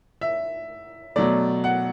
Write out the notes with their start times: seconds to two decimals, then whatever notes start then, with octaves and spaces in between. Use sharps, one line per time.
0.21 E5
1.16 B2 F#3 A3 D5
1.64 F#5